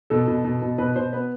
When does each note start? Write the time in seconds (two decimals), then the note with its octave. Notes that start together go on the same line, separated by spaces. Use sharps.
0.10 B2 A4
0.28 B2
0.45 B2
0.62 B2
0.78 B2 B4
0.96 B2 C5
1.13 B3 B4